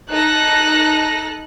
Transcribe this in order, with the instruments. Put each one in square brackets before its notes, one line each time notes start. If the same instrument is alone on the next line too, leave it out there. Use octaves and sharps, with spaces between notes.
[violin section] D#4 A4 A#6 [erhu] F#6